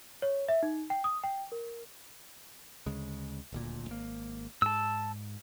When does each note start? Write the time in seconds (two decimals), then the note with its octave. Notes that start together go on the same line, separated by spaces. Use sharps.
0.22 C#5
0.48 E5
0.63 D#4
0.90 G5
1.04 D#6
1.24 G5
1.52 A#4
2.86 D2 C#3 G#3
3.53 D#1 D2 A#2
3.87 G#1 A#3
4.62 G#2 A5 E6